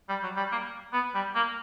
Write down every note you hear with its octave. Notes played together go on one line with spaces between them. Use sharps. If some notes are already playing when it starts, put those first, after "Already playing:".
G3
F#3
G3
A#3
B3
G3
A#3